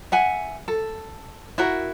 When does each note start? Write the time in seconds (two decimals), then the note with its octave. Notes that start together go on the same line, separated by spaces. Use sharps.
0.12 E5 F#5 G#5
0.68 A4
1.58 E4 F#4 A#4